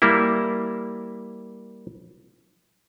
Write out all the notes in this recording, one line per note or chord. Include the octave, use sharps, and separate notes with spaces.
G3 A#3 E4